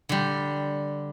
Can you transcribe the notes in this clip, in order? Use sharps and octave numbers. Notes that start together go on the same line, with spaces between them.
D3 G3